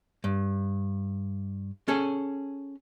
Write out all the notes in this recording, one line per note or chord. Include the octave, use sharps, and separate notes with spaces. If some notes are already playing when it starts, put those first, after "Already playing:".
G2
C#4 G#4 A4